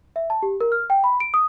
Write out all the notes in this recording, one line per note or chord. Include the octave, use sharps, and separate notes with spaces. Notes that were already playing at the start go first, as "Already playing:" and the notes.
E5
A5
G4
A#4
F6
G5
B5
D7
D#6